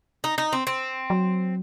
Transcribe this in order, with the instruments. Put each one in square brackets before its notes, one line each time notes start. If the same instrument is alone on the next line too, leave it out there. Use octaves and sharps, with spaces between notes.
[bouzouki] D#4
D#4
C4
C4
[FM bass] F#3